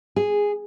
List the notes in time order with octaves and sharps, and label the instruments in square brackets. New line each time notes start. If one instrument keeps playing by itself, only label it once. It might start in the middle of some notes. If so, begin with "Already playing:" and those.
[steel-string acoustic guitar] G#4